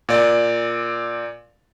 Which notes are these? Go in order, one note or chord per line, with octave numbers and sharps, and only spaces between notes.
A#2 D5